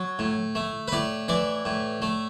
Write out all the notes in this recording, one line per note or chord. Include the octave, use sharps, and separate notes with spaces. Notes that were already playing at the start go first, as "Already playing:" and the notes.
Already playing: F#3
A2
A3
B4
A2 D5
E3 D5
A2
A3